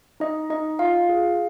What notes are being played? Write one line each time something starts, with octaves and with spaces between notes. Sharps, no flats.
D#4 D#5
D#4 D#5
F4 F5
G#4